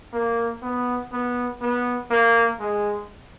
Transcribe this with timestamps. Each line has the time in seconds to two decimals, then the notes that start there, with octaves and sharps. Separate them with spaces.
0.13 A#3
0.62 B3
1.12 B3
1.61 B3
2.11 A#3
2.60 G#3